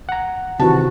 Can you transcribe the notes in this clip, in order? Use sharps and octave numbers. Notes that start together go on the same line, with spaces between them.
F#5 A#5
C3 D#3 E3 F#4 A5